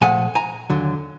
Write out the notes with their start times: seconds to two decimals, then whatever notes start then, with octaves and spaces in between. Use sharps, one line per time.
0.02 A#2 F3 A3 F#5 G#5
0.35 G#5 A#5
0.70 D#2 D3 F#3